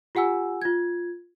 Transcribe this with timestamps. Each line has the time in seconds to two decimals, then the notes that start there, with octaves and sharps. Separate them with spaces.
0.15 F4 G4 F#5 G#5 E6
0.62 F4 G#6